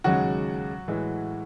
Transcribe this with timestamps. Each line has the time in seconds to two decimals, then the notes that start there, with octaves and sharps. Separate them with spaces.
0.04 D#2 C#3 F#3 G#3 F#4
0.88 A2 E3 G#3